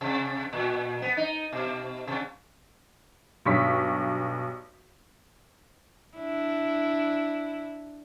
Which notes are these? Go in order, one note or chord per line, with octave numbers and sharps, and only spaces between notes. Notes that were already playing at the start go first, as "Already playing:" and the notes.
C3
A#2
B3
D#4
B2
C3
B1 G2 C#6 B6
D4 E4